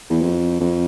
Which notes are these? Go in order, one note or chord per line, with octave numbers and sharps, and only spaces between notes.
E2
F2
F2